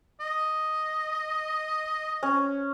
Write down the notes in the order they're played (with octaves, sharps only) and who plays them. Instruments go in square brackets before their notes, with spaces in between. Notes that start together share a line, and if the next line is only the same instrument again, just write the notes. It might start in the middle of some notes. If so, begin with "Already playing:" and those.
[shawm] D#5
[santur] C#4